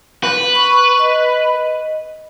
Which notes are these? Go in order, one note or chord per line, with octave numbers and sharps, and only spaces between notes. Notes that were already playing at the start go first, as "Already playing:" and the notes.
B4
C#6
D#5